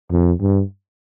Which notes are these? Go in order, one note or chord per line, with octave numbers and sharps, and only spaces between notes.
F2
G2